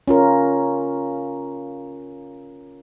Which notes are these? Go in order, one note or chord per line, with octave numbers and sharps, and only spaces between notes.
C#4 F4 A#4